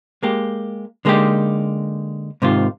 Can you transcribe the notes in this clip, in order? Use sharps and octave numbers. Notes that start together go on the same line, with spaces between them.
G#3 A#3 G4
D3 G#3 A#3 C#4 D#4 G4
G#2 C3 D#3 F4